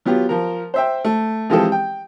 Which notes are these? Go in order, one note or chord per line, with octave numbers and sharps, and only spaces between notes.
F#3 B3 F4 G4
F3 A#4
C5 E5 G5
A3
E3 F3 G#3 C4 G4 A4
G5